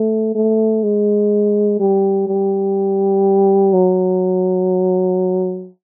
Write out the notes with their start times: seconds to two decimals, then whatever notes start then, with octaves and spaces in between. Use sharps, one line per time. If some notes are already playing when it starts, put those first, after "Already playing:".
Already playing: A3
0.35 A3
0.83 G#3
1.80 G3
2.28 G3
3.73 F#3